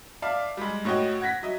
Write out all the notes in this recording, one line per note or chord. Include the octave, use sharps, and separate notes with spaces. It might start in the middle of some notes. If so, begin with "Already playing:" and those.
D5 E5 F5 A5
G3 G#3
A2 F#4 C#5 D#5 G5
F#5 G#6 A#6 B6
F#3 D#5 E5